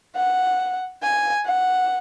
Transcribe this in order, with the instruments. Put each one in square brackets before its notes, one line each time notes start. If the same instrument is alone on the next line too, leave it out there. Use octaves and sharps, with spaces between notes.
[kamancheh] F#5
G#5
F#5